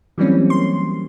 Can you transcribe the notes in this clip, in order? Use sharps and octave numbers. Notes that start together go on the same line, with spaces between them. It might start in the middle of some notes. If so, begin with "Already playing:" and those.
E3 F#3 G3 A#3 C4 C#4
C6